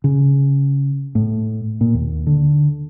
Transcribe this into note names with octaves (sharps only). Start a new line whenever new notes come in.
C#3
A2
A#2
D#2
D3